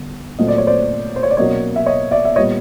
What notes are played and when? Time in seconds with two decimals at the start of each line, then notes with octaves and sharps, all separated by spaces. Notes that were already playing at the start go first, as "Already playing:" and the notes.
Already playing: D3 G3 B3
0.39 A#2 F#3 A3 C4 D#5
0.48 D5
0.58 C#5
0.67 C5 D5
1.16 C5
1.23 C#5
1.30 D5
1.37 B2 F#3 A#3 C#4 C#5 D#5
1.76 E5
1.86 C#5 D#5
2.11 D5 E5
2.25 E5
2.36 A#2 G3 B3 C#5 D#5